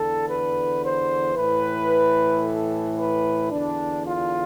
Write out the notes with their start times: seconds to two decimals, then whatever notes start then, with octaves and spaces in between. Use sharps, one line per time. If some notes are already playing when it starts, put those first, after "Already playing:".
Already playing: E2 D3 A4
0.28 B4
0.82 C5
1.35 A2 E3 B4
2.43 A4
2.97 B4
3.51 E2 D3 D4
4.05 F4